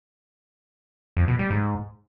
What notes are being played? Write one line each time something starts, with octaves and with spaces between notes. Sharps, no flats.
F2
B2
G3
G#2